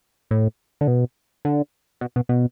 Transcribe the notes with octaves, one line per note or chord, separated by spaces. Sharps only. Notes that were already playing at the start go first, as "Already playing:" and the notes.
A2
D3
B2
D3
B2
B2
B2